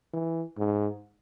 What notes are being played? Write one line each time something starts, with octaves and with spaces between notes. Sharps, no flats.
E3
G#2